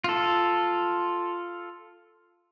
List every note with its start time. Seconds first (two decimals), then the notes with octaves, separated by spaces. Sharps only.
0.04 F4 A4